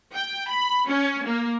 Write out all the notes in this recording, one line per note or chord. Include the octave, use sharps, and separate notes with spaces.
G5
B5
C#4
A#3